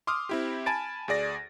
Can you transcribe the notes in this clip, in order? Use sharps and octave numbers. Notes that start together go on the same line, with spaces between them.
C6 D6 D#6 F6
C4 E4 G4
G#5 A5 B5 A6 D7
D2 G#4 D5 A#6